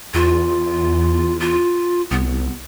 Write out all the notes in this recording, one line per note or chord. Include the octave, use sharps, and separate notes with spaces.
E2 F4
F4
C2 B3